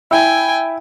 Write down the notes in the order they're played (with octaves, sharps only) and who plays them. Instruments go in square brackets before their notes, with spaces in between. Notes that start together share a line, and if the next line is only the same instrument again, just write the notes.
[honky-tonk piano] E4 [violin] G5 G#5